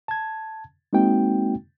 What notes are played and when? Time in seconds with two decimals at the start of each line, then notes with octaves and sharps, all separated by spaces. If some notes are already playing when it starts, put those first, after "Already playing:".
0.08 A5 G#6
0.93 G#3 A#3 C4 D#4 F#4 G5